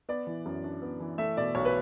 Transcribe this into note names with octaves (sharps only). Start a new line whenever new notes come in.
B3 D5
E3
F#2
D4
B3
E3
A3 E5
B2 D5
B1 C#5
B4